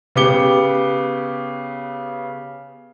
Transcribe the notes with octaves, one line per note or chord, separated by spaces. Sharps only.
C#3 B3 G4 D6 C#7 G7